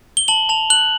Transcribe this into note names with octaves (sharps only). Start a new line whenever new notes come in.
G7
A5 F#7
A5 F7
F#6 F#7